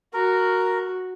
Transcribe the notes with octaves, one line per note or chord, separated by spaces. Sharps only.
F#4 A#4